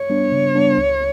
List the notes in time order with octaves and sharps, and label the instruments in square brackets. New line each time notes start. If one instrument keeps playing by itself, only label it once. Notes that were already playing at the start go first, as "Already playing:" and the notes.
Already playing: [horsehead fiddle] C#5
[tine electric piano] G3 B3 D4
C#3
G3 B3 D4
C#2